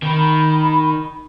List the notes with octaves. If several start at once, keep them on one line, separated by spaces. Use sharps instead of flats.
D#3 B5